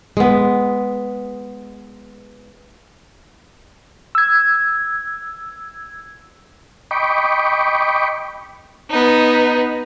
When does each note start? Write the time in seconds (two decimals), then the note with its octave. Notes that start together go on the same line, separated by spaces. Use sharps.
0.17 G#3 B3
4.15 E6 G#6
6.91 D#5 G5 B5 C#6 D6
8.91 B3 D#4